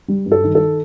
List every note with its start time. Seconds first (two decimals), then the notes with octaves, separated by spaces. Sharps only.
0.08 G3
0.26 G2
0.32 A4
0.44 D#3
0.55 A4